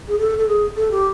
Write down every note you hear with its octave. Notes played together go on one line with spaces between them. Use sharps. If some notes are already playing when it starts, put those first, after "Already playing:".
G#4
A4
A4
G#4
A4
G4